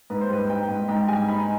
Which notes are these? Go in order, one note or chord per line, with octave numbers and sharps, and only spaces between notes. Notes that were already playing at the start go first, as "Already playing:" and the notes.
G#2 B4
C5
G3 B4
D#4 G5
G#2
G#2 G5
G3 G#5
D#4 B5